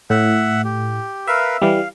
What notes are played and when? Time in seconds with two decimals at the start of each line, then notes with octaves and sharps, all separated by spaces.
0.10 A2 E5 F#5
0.64 G4
1.27 A#4 B4 E5 F5
1.62 E3 G3 F5